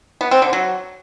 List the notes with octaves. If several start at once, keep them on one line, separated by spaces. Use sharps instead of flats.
B3
C4
D3
F#3